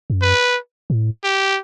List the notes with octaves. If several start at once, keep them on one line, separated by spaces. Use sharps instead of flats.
F#2
B4
A2
G4